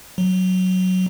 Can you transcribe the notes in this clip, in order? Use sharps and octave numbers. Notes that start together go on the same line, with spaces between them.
F#3